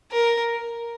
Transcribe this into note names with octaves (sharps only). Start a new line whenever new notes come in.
A#4